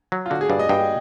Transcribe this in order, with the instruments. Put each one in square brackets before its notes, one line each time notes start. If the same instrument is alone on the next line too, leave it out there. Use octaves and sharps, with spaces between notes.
[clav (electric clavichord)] F#3
[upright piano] F4
[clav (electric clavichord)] D3 [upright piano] F#4
[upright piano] G#4
[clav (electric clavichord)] G2 [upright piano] D5
[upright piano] D#5
[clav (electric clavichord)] G2 [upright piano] G5